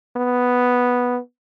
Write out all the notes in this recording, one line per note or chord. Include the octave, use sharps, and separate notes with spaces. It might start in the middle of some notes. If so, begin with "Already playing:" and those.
B3